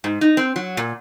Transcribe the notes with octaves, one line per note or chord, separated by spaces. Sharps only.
G#2
D#4
C4
F#3
A#2